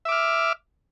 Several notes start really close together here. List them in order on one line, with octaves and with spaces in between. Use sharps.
E5 D6 F6